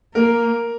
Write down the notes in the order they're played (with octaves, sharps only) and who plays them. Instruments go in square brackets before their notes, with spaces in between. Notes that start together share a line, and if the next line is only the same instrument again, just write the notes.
[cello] A#3 [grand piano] A#4